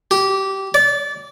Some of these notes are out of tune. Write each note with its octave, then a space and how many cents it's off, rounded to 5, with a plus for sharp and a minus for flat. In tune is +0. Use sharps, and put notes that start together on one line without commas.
G4 -20
D5 -25